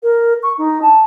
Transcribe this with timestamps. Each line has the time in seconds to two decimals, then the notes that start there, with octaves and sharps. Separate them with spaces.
0.03 A#4
0.43 C#6
0.58 D#4
0.82 A5